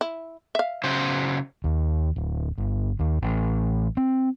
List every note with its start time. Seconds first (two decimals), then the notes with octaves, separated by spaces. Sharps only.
0.01 E4
0.55 E5 F5
0.84 C#3 F#3 C5
1.64 D#2
2.16 D1
2.58 G1
2.99 D#2
3.22 A1
3.97 C4